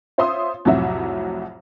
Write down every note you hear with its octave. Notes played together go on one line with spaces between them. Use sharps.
F4 C5 C#5 E5 C6 D#6
C2 F2 A2 F#3 F#4 E5